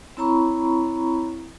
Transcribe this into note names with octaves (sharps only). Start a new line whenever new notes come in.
C4 E4 C#5 A#5 B5 C#6